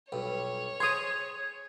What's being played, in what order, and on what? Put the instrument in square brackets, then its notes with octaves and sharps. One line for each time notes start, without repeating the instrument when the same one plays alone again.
[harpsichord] B1 G2 [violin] C#5
[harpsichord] G#4 C5 [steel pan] C6 D#6 [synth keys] G#6